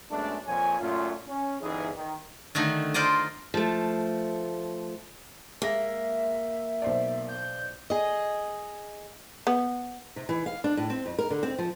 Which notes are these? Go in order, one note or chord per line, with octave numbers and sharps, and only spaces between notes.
F#2 G#3 A3 B3 C#4 D4
F2 A#2 F3 C#5 G#5
F#2 A#2 A3 C#4 F4
C#4
G1 E3 D#4 G#4
D#3
D3 D#3 A3 D#4
F4 A#4 C5 D5 D#5
F3 A3
G#3 A#3 E5 A#6
B1 C5 D5
G6
G#4 D#5
B3
C3
E3
F5
D4
A2
C4
F2
A#4
D3
C4
F3